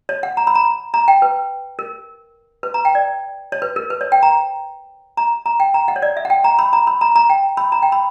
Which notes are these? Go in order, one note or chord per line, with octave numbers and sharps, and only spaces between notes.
C#5
F#5
A#5
B5
A#5
A#5
G5
B4
A#4
B4
A#5
G5
D5
C#5
B4
A#4
B4
C#5
G5
A#5
A#5
A#5
G5
A#5
F#5
C#5
D5
E5
F#5
G5
A#5
B5
A#5
B5
A#5
A#5
G5
B5
A#5
G5
B5